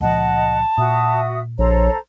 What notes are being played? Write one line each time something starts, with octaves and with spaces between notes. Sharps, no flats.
C#2 A#2 F3 D#5 F#5 A5
A#2 F#4 E5 D#6
A#1 A4 C5 C#5 A#5